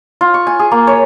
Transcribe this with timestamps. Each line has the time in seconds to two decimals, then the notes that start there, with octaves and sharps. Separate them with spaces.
0.21 F4
0.34 C#6
0.47 G#5
0.59 G#4
0.71 A#3
0.87 C#5